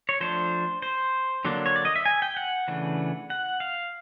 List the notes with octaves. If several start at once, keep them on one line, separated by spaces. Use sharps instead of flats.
C#5
F3 A3 D4 C5
C5
D3 F#3 A#3 D4
C#5
D5
D#5
E5
G#5
G5
F#5
C#3 E3 A3 D4
F#5
F5